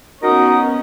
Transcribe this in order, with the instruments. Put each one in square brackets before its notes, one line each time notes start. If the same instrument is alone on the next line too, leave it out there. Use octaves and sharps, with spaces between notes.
[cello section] B3 C#4 [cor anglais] D#4 [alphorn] F#4 [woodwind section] A#4 D#6